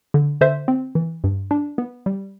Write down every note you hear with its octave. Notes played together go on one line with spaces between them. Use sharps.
D3
D3 C5 E5
C4
E3
G2
D4
B3
G3